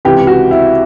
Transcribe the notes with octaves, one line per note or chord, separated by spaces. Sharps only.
C#2 C3 E3 G4
F#4
E4